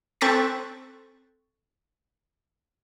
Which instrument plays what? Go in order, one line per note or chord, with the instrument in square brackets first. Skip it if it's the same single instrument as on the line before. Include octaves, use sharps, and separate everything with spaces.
[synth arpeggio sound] C4 A4 C#6 F#6 A6 B6